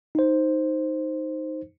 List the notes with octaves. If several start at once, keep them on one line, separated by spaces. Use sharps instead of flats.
D#4 C5